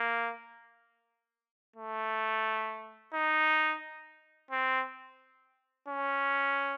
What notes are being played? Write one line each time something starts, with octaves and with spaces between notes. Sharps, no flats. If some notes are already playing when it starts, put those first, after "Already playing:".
Already playing: A#3
A3
D#4
C4
C#4